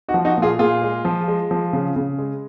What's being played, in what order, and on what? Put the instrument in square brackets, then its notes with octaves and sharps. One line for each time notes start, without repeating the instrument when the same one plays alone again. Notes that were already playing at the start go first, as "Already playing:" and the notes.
[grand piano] D#4 F#4
F3
D#4 F#4
A#2
F4 G#4
A#2 F4 G#4
G#3
F3
G#3
F3
C#3
C#3
G#3